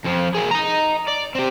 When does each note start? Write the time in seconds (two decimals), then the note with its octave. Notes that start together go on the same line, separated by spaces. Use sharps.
0.04 F2 F3
0.35 A#3 G#4
0.51 D#5 A#5
1.08 D5
1.35 C4 G4